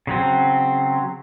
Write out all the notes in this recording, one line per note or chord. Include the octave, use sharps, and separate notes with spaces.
C#3 F#3 C4